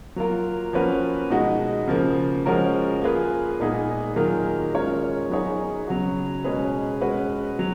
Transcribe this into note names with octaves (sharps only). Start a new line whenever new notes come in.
F#3 A#3 F4 A#4
F3 A#3 C#4 F#4 B4
B2 G#3 B3 D#4 F#4
C#3 F3 A#3
F3 G#3 C#4 F#4 A#4
A#3 F4 G#4 B4
A#2 G#3 B3 D#4 G#4
D#3 F#3 A#3 F4 G#4
G#3 C#4 F4 A#4 C#5
F#3 B3 D#4 G#4 C#5
C#3 F#3 B3 F#4
B2 G#3 C#4 G#4 B4
G#3 C#4 F#4 B4
F#3